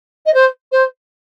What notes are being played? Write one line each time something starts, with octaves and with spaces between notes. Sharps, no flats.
D#5
C5
C5